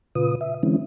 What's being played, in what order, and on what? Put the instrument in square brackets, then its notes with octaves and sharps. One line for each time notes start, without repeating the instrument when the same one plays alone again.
[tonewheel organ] A#2 C#3 F4 B4 D#6
E5
D3 E3 G#3 C4 C#4 E4